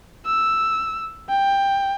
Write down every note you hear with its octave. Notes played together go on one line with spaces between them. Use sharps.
E6
G5